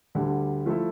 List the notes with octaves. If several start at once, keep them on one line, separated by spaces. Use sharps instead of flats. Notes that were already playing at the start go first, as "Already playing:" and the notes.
D2 D3 G3
F3 A3 E4 A4